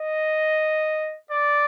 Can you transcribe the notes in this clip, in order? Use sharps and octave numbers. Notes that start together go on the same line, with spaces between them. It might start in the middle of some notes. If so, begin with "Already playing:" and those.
Already playing: D#5
D5